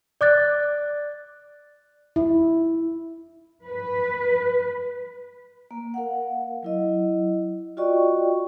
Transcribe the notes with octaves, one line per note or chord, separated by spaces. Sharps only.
D5 D6 F#6 A6
E4
B4
A#3
A#4 F5 F#5
F#3 E4 D#5
F4 F#4 D5 D#5 G5 C#6